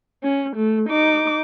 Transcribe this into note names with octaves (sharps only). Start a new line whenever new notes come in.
C#4
A3
D#4 D6